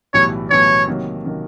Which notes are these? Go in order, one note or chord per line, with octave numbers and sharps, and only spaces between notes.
B1 A2 E3 G3 B3 C#5
B1 A2 E3 G3 B3 C#5
C3 D#3 F#3 A#3
C3 D#3 F#3 A#3